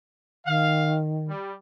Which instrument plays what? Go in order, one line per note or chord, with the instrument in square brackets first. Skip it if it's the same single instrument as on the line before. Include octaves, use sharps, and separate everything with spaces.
[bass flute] D#3 [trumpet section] F5
[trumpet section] G3